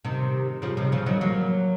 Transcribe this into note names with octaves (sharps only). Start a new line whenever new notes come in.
C3 D#3
C#3 F3
C3 D#3
C#3 F3
D#3 F#3
F#3 A#3